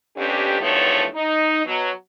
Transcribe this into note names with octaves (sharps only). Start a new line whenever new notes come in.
F2 B3 C#4 D4 G4
E2 G2 D#3 F3 A3 C#5
D#4
B2 F#3